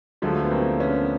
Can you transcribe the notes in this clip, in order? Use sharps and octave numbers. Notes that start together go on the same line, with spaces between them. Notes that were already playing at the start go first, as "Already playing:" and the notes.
D2 D3 F3 F#3 G#3 A3
B3
A#3 C4
B3 C#4